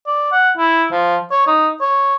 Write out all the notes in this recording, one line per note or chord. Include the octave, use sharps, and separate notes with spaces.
D5
F#5
E4
F3
C#5
D#4
C#5